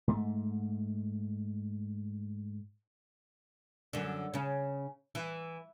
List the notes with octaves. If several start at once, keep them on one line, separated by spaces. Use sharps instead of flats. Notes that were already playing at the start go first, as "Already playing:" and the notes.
G#2 A3
F#2 D3
C#3 C#4
E3